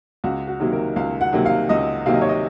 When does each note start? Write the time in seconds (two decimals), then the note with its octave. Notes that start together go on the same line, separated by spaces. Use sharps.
0.24 C#2 F#4
0.47 F#4
0.60 C3 D#3 F#3 A#3
0.73 A#4
0.96 C#2 F5
1.21 F#5
1.33 C3 D#3 F#3 A#3
1.46 F5
1.69 C#2 D#5
2.06 C3 D#3 F#3 A#3 F5
2.14 D#5
2.21 C#5
2.29 D#5